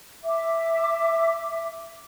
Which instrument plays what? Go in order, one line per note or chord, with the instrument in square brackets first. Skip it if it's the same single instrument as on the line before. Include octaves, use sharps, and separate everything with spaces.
[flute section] E5 D6